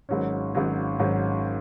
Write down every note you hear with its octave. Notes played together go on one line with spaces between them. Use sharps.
G#1 G#2 F#3 C#4
G#1 G#2 F#3 C#4
G#1 G#2 F#3 C#4